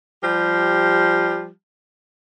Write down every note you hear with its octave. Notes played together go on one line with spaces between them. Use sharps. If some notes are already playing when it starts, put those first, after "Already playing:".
F3 G3 G4